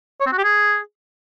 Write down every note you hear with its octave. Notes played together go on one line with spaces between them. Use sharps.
C#5
C4
F#4
G4
G#4